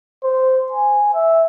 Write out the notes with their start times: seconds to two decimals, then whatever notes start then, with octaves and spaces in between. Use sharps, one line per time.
0.24 C5
0.72 G#5
1.14 E5